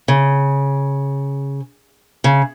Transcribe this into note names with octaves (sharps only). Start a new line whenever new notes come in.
C#3
C#3